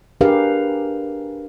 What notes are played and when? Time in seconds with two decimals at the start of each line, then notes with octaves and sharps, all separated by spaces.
0.21 D4 G4 G#4 A#4 B4 F5